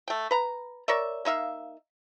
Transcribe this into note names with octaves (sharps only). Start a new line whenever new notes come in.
A3 G5
B4 A#5
A#4 C#5 D5 E5
A#3 D#4 E5 F5